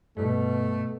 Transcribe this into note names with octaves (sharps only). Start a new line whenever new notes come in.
G2 B2 A3